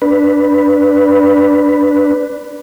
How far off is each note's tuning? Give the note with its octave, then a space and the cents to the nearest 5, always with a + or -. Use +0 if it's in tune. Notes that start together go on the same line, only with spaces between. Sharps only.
D4 +0 B4 +0